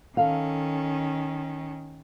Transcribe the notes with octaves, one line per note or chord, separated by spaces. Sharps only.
D#3 C#4 A4 F5